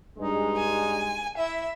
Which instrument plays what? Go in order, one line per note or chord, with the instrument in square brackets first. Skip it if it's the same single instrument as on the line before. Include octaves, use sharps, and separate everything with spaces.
[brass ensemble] G2 G#3 [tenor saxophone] D#4
[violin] G#5
[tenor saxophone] E4 [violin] E5